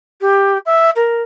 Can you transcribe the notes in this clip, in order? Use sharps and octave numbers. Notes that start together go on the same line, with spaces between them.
G4
E5
A#4